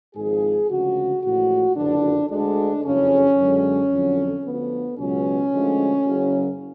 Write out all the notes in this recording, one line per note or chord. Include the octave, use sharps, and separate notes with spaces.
G#1 G#2 F3 G#3 G#4
D2 C#3 F3 G#3 F#4
A1 A2 F3 G#3 F#4
F#1 F2 D3 D4
D2 D3 G#3 D4
F#1 F2 C#3 C#4
F#2 D3 G#3
F2 D3 F#3
D2 D3 F3 B3
C#2 B2 F#3 C#4
D2 D3 F3 G#3
F#1 F#2 C#3 F#3